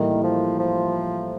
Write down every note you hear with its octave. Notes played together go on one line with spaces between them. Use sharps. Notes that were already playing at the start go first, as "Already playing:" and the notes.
Already playing: A2 D#3 E3 G3 A#3
F3
F3